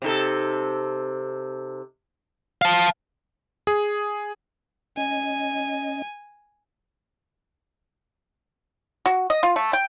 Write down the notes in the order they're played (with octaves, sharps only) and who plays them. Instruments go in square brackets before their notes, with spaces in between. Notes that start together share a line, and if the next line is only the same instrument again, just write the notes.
[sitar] C3 D#4 A4
[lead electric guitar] F5 A5
[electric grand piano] G#4
[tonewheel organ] C#4 D#5 [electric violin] G#5
[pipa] F#4
D#5
F4
A3
G5